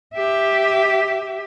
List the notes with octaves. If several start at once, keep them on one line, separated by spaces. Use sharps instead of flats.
G4 E5